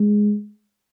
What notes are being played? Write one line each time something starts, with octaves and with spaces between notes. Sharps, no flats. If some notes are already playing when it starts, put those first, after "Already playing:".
Already playing: G#3